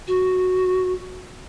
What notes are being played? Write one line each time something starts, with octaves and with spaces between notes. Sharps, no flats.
F#4